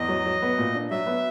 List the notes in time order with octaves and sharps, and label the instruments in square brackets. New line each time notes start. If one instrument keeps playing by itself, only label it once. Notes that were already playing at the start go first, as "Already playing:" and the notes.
Already playing: [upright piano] E2 [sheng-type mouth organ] D#5
[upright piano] F#3
F#3
B3
A#2
D4
[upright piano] F#3 [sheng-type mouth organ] E5
[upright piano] B3